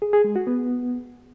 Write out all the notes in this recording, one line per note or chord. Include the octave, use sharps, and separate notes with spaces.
G#4
G#4
G#3
F#4
B3